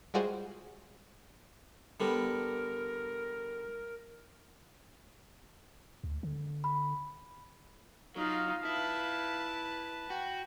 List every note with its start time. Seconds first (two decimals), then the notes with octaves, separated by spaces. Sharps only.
0.14 G3 G#3 F4 F#4 G#4 C5
2.00 D3 G3 B3 A#4
6.04 D2
6.23 D3
6.64 B5
8.16 F#3 D#4 F4 F5
8.65 E4 B4 A5
10.10 F#4 G5